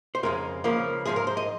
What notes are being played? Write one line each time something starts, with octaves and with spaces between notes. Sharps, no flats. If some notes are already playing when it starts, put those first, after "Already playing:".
C5
F2 C#3 G#3 A#4
C#2 C#3 F3 A#3 A#4
G#2 F3 G#3 G#4
A#4
C5
D#5